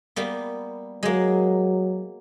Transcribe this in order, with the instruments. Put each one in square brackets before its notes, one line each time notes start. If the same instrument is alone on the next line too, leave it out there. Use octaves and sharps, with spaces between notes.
[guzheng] G3 A#3 B3
[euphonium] F#3 [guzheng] G#3 A#3